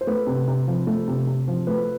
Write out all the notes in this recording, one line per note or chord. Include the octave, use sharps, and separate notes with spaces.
C5
A3 B4
C3
C3
F3
A3
C3
C3
F3
A3 B4